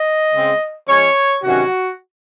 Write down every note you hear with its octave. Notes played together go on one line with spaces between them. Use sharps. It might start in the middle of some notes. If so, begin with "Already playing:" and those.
Already playing: D#5
C#3 G#3 C4
F3 G#3 C#4 C#5
C3 D#3 F#3 C#4 F#4